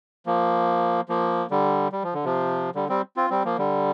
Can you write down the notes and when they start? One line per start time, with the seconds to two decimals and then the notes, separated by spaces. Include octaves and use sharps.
0.26 F3 A#3
1.09 F3 A#3
1.51 D3 G3
1.92 G3
2.03 F3
2.14 D3
2.24 C3 F3
2.75 D3 G3
2.89 G3 C4
3.17 C4 F4
3.30 G3 C4
3.44 F3 A#3
3.58 D3 G3